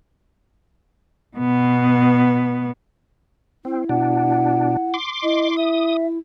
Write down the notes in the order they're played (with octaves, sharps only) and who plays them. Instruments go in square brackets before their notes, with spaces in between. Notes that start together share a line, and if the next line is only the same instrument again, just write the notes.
[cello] B2 B3
[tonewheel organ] C4 [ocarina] E4
[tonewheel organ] B2 D4 [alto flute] F#5
[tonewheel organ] C6 D6
[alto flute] E4 [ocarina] D#5
[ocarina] E5 [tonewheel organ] D#6